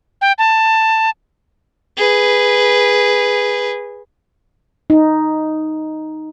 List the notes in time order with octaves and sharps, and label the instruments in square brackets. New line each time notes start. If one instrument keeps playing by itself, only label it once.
[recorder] G5
A5
[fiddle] G#4 B4
[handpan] D#4